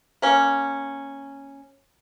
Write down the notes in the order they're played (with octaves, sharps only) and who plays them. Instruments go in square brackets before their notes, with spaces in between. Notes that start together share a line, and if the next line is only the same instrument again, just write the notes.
[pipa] A#3 C#4